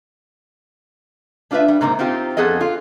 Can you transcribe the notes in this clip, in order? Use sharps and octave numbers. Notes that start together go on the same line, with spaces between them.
A3 D4 F4 A4 B4 E5
G3
G#2 C3 A#3 D#4
C4 D#4 F4 G4
F2 B3 G#4 A4 D#5
F4